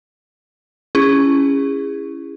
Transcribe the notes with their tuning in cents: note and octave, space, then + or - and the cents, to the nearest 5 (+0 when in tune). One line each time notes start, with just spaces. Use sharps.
C#4 +0 E4 +15 G#4 -25